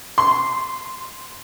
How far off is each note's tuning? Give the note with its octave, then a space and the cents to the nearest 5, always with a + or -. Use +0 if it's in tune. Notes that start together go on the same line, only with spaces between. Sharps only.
C6 -10